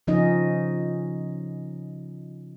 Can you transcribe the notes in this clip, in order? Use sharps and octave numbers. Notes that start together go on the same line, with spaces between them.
C#3 F3 C#4 D#4 D#5